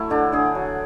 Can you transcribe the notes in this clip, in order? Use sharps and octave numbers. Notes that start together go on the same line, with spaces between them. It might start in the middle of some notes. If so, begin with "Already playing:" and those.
Already playing: F#3 A3 E4
D3 D4
D3 G#4
F#3